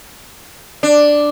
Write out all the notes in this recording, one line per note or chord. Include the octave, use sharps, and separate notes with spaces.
D4